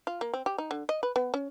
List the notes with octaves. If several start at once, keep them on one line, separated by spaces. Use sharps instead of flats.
F4
A#3
C4
G4
D#4
D3
D#5
B4
B3
C#4